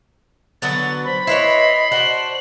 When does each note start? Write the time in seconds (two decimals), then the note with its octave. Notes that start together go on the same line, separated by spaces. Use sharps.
0.62 D3 F#3 B3 A6
1.05 C5 B5
1.27 E4 B4 C#5 D#5 C6
1.91 D4 F#4 C5 F#7